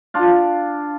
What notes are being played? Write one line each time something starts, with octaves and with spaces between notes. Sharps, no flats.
D4 F4